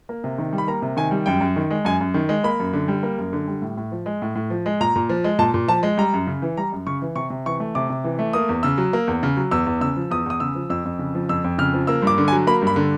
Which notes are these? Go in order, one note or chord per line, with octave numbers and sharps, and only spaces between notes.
A#3
C3
D#3
G3
B5
A#3 A#5
C3
D#3 G#5
G3
F#2 G5
F#2
D#3
G#3
F#2 G#5
F#2
D#3
G#3
A#3 B5
F#2
D3
G3
A#3
F#2
D3
G3
A2
A2
F3
G#3
A2
A2
F3
G#3
A#2 A#5
A#2
F3
G#3
A#2 A5
A#2
F3 A5
G#3
G3 A#5
F#2
C#3
E3
G3 A#5
F#2
C#3 C#6
E3
C3 C#6
C3
E3 C#6
A3
C3 D6
C3
E3
A3
A#3 D#6
E2
C#3 E6
F#3
A#3
E2
C#3
F#3
E2 E6
E2
C#3 E6
F3
E2 D#6
E2 D#6
C#3 E6
F3
F2 E6
F2
C#3
F3
F2 E6
F2
C#3 F6
F3
A#3 E6
G2 D6
D3
G#5
F#3
A#3 B5
G2
B5
D3